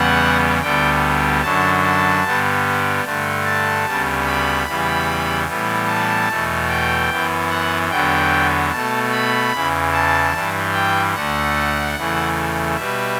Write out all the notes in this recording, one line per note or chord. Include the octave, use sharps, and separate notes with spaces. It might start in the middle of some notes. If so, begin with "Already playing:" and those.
Already playing: E2 C#3 G3 B3 F#5
D2 D3 G3 B3 G5
F#2 D3 F#3 A5
A5
G2 D3 G3 B3
G2 D3 A3
A5
D2 C#3 G3 B3
B5
E2 C#3 E3 G3 B3
A2 E3 G3 B3
A5
E2 B2 A3
G5
F#2 E3 B3
F#5
E2 D3 F#3 B3 G5
B2 A3 A5
B5
E2 C#3 E3
A5
G2 E3 G3
G5
D2 D3 A3 F#5
E2 C#3 E3 A3
B2 G3 B3 E5